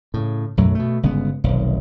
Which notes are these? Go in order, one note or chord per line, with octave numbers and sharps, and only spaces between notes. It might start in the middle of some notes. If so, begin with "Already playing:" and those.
A2 C#3
B1 F#2 F#3 A3
B2 A3
G1 C#3 G#3 B3
F1 B1 D#3